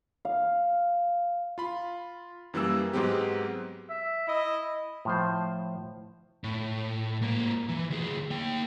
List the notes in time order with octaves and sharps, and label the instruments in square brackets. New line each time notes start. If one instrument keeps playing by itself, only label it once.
[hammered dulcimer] F5
[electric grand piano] F4 B5
F#2 E3 G3 A#3 E6
G#2 F#3 G#3 B3 C4 G4
[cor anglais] E5
[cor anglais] E4 [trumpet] D#5
[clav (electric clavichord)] A2 F3 C5
[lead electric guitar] A2
G#2 A#3
E3
D2 G#4
A#3 G5